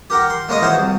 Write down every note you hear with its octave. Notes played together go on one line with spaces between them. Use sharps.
G4 A#4 F#5 G5
C6
G#3 A#3 C#4 A#4 D#5
E3 F#4 C5 C#5 D#6
C2